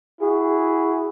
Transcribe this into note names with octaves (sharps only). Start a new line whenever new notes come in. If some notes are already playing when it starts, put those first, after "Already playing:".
E4 F#4 G#4